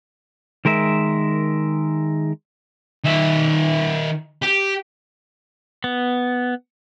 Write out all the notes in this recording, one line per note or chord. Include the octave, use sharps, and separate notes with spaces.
D#3 G#3 A#4 E5
D#3 E5
G4
B3